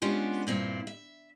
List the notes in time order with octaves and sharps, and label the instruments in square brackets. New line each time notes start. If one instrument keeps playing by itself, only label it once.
[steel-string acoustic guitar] G#3 B3 C#4 D4 F4 G4
G2 A#2 C4 E4
E5